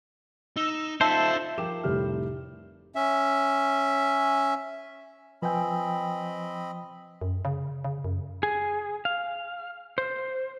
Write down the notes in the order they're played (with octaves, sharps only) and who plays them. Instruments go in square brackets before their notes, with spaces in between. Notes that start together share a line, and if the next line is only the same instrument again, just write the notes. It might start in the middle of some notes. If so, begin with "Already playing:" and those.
[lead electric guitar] D#4 [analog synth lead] E6
[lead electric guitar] D#4 F4 [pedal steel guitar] A4 C5 [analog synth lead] E5 [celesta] A5 E6
[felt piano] F3 A#4 G5 D6 E7
F1 A2 G3 G4 E5 F6
[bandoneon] C#4 E5
[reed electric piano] F3 G5 [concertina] C4 D#5 B5 [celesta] B4 G#5 E6
[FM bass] F#2
C#3
C#3
F#2
[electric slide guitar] G#4
F5
C5